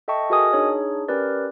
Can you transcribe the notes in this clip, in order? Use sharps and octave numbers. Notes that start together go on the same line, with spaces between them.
A4 D#5 E5 G5 A5 C#6
F#4 G#4 A#4 D#5 G#5 D#6
D4 D#4 G#4 C#5
C#4 G4 A#4 B4 D5